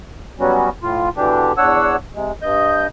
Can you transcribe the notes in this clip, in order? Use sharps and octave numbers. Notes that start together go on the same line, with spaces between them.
F#3 G3 B3 C#4 F#4
A2 F4
B2 D3 E3 D4 G4
E2 D4 C#5 F#5 E6
C3 G#3
G2 D#5 G6